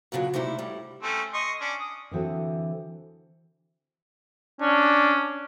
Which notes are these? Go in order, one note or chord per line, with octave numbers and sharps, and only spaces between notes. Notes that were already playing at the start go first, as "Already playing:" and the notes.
F#2 A#2 C#3 F3 F#3
C3 G3 A3 D#4 E4 C5
A2 G3
A3 C4 C#4
D#5 C6 C#6
C#4 D4
D#6
D3 E3 C4 F#4 A4
C#4 D4